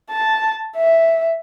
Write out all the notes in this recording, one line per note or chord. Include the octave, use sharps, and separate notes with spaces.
A5
E5